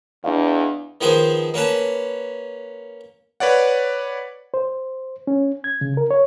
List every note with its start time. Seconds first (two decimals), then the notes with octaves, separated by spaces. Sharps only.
0.24 E2 D4 D#5 F5
1.01 D#3 F3 B3 G#4 C5
1.54 A#3 C#4 B4 A5
3.40 B4 C#5 D5 F#5
4.54 C5
5.27 C#4
5.64 G#6
5.81 C#3
5.97 A#4
6.11 C#5